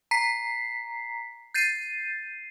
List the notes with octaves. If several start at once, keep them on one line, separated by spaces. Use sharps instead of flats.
A#5 B6 C7
G6 A6 C7 D#7